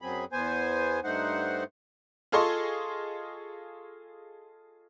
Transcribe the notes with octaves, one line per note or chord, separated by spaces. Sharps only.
F#2 F#3 C4 G#4 B5
E2 B3 C5 G#5
G2 A3 D#4 C5 F#5
F4 G#4 A4 D#5 C6 C#6